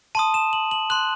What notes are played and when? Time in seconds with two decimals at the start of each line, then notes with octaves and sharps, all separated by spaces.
0.15 A5 C6 D#6 D#7
0.34 E7
0.53 F#7
0.71 F#7
0.90 C6 F#6 F#7